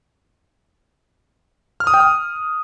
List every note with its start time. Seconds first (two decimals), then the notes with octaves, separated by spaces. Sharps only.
1.80 F6
1.87 D#6
1.94 G5
2.00 D#6